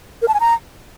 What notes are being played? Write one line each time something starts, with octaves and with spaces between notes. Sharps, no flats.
A#4
A5
G#5
A#5